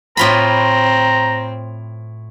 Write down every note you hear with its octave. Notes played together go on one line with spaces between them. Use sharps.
A2 C4 F4 A#5 B5